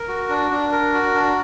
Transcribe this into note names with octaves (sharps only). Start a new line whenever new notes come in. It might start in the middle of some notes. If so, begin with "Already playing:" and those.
Already playing: A#4
F#4
D4
D4
A#4
F#4
D4